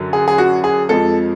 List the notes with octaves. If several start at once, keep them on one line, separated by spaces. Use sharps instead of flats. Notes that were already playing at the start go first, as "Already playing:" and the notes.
Already playing: F#2 D3 F#3
G#4
G#4
F#4
G#4
F2 F3 G#3 A4